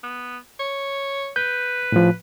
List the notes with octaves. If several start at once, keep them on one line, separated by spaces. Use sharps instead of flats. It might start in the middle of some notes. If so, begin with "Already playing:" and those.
B3
C#5
B4 G6
A2 F3